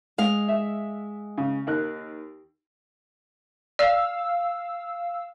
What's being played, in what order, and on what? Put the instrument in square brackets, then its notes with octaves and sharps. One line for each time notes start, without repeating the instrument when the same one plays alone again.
[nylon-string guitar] G#3 F5
[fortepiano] E5
C#3
D#2 A#4 F#6
[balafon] D5 [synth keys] F5 E6